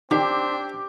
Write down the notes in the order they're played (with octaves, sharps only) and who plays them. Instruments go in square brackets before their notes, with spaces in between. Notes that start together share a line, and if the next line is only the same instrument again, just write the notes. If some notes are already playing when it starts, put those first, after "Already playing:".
[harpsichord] D#3 [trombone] C4 [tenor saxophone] D4 [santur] G4